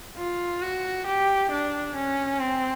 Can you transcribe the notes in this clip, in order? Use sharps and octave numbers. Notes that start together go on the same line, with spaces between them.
F4
F#4
G4
D4
C#4
C4